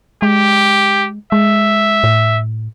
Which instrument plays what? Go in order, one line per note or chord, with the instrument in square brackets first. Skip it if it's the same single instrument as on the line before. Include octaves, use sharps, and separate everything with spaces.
[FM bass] G#3 [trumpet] G4
[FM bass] G#3 [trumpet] E5
[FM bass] A2